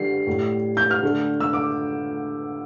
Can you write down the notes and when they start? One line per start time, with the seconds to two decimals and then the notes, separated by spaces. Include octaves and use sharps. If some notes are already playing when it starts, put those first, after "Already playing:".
Already playing: D3 G3 C7
0.27 A2 G3
0.77 G6
0.91 F6
1.02 D3 A3
1.40 E6
1.53 D6